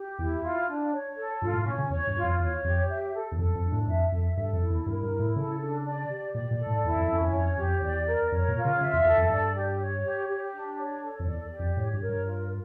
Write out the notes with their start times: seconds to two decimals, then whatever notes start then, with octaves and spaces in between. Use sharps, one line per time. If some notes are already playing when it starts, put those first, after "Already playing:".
Already playing: G4
0.18 E2 E4
0.43 F4
0.67 D4
0.92 C#5
1.17 A4
1.41 G2 F4
1.53 A2
1.66 A#2 C#4
1.78 C#3
1.90 E2 C#5
2.07 G2
2.16 F4
2.24 F2
2.39 E2 C#5
2.64 F2 G4
2.89 E5
3.14 A4
3.32 E2
3.39 F2 A4
3.55 F2
3.63 D4
3.72 A2
3.87 F2 E5
4.12 F2 A4
4.37 G2 A4
4.53 F2
4.62 E4
4.70 E2
4.86 G2 A#4
5.03 G2
5.11 E4
5.19 A2
5.36 C#3 A4
5.60 D4
5.85 D5
6.09 G4
6.34 A#2 D5
6.51 A#2
6.59 A4
6.66 A2
6.84 E2 E4
6.96 F2
7.08 F2 C#4
7.21 F2
7.32 F2 C#5
7.57 F2 G4
7.81 E2 D5
8.06 A#4
8.32 F2 C#5
8.48 A#2
8.56 F4
8.65 C#3
8.81 C#3 E5
8.93 E2
9.05 E2 A4
9.18 F2
9.30 G2 D5
9.55 G4
9.79 C#5
10.04 G4
10.28 G4
10.53 D4
10.78 C#5
11.02 A4
11.19 F2
11.27 E2 D5
11.52 G4
11.59 F2
11.77 A2 C#5
11.93 G2
12.01 A#4
12.09 G2
12.25 F4